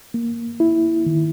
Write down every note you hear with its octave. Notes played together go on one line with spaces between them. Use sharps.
A#3
E4
D#3